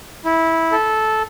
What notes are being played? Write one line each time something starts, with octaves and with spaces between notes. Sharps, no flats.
E4
A4